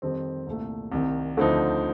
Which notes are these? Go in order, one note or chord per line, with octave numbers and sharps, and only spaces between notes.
F2 D#3 G3 C4
C2 A#2 A3
C2 C3 D#3
D2 D3 F3 C4 D#4